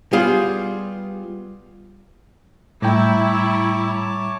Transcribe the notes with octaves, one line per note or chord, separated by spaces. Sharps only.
G3 B3 F4 G#4
A2 G3 E4 C#5 G5 A5 A#5 D6